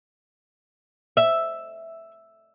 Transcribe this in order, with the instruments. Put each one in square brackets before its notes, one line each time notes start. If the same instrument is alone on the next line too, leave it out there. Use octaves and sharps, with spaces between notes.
[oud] E5